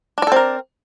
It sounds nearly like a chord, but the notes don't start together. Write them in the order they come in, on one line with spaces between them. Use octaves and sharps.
D4 D5 A4 C4 A#4